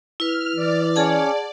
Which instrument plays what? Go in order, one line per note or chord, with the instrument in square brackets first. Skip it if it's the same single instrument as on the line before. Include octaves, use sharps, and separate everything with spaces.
[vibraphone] E4 B4 [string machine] F6
[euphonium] E3 [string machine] D5
[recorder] C#4 [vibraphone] G#4 F#5 A5